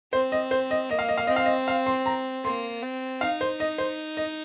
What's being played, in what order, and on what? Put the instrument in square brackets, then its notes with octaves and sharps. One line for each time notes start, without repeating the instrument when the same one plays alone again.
[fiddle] C4 [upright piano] C5
[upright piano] D#5
C5
D#5
[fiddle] A#3 [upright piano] D#5
[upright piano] F5
D#5
F5
[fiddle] C4 [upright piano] D#5
[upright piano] F5
D#5
F5
C6
A#5
[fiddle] A#3 [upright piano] C6
[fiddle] C4
[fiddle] D#4 [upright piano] F5
[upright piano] C5
D#5
C5
D#5